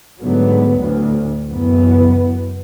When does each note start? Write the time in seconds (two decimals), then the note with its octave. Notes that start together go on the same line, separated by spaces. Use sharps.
0.22 G#2 D3 F#3 A3 B3
0.79 D2 A2
1.52 F#1 F#2 E3 B3